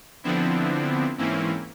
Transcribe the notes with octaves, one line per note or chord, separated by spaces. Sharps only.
D3 F3 B3 C4 D4 E4
G#2 E3 A#3 C4 C#4 E4